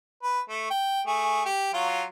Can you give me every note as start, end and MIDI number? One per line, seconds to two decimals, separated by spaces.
0.23 0.40 71
0.49 0.67 57
0.71 1.01 79
1.07 1.43 57
1.07 1.43 68
1.46 1.70 67
1.74 2.04 54
1.74 2.04 65